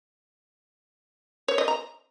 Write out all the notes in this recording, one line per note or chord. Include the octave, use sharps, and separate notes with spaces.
C#5
D#5
A#5